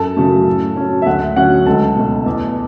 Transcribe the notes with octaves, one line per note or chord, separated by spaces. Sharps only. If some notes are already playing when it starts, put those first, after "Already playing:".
Already playing: F#2 A4 A5
C#3 F#3 A3
A2
F#3 C#4
E5
D2 F#5
D3 F#3 C#4 F#5
C#2 A4 A5
B2 A3
E2